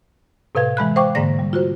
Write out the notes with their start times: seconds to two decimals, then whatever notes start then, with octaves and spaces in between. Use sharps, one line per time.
0.55 A2 C3 B4 F5 G#6
0.77 E3 G#3 B5 F#6
0.96 C5 F5 G5 C#6 D6
1.15 G#2 D3 A#3 D5 A#6
1.39 G3
1.53 F4 F#4 C5